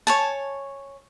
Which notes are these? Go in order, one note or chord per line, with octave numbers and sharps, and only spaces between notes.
C#5 G#5 A5